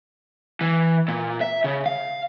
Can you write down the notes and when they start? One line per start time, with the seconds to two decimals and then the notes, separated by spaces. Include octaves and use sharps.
0.61 E3
1.08 A#2
1.41 E5
1.64 C#3
1.86 F5